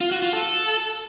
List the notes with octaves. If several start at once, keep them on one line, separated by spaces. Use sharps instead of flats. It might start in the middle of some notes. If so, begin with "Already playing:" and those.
F4
F#4
F4
A4